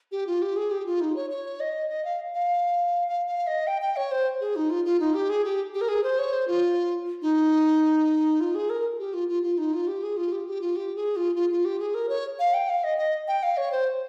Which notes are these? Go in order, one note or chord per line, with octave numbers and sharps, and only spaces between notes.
G4
F4
G4
G#4
G4
F4
D#4
C#5
C#5
D#5
D#5
F5
F5
F5
F5
D#5
G5
G5
C#5
C5
G#4
D#4
F4
F4
D#4
G4
G#4
G4
G4
A#4
G#4
C5
C#5
C5
F4
D#4
F4
G#4
A#4
G4
F4
F4
F4
D#4
F4
G4
G#4
F4
G4
G4
F4
G4
G#4
F4
F4
F4
G4
G#4
A#4
C#5
F5
G5
F5
D#5
D#5
G5
F5
C#5
C5